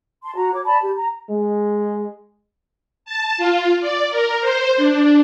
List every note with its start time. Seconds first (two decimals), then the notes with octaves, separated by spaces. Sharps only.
0.24 A5 C6
0.35 F#4 A#5
0.53 C#5 D6
0.65 D5 A5 B5
0.81 G4
0.97 A#5
1.30 G#3
3.05 A5
3.37 F4
3.81 D5
4.10 A#4
4.41 C5
4.76 D4